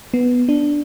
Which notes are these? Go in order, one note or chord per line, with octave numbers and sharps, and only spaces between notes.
B3
D4